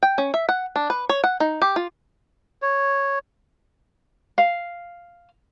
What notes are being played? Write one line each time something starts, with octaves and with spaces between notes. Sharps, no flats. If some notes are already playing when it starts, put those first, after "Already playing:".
G5
C#4
E5
F#5
D4
B4
C#5
F#5
D#4
G4
F4
C#5
F5